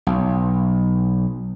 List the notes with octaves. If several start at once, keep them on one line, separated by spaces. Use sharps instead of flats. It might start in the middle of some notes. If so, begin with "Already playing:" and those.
B1